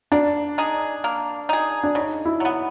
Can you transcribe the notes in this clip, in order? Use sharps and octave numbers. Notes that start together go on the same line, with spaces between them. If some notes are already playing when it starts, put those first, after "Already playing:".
A#3 D4
D#4 G#4
A#3
D#4 G#4
D4
C#3 D#4
E4
F#3 B3